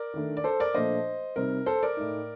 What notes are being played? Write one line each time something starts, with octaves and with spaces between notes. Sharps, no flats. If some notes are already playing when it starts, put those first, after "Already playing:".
Already playing: A#4 D5
D#3 A3 D4
D5
A4 C5
A#4 D5
A#2 F3 A3 D4 C5 D#5
C3 G3 C4 D#4 A#4
A4 C5
A#4 D5
A2 A3 D#4